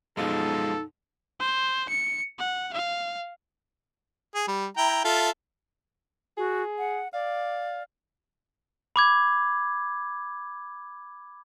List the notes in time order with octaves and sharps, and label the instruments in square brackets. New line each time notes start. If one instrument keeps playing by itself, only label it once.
[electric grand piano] F#2 B2 F3 [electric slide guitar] G#3 B3 F4 [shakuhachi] D#4 [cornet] A4
[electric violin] C5
C#7
F#5
F5
[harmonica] G#4
G3
E4 G5 A#5
F4 A4 E5
[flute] F#4 [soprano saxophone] G#4
[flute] F#5
[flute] D5 [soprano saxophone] F5
[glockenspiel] B5 D6 G#6